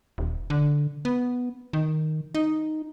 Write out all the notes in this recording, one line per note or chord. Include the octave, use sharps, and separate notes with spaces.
D#1
D3
B3
D#3
D#4